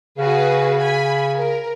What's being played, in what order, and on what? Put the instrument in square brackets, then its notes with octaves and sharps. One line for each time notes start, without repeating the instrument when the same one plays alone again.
[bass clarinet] C#3 [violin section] F#4 G#4 B4
[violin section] G#5 B5
A#4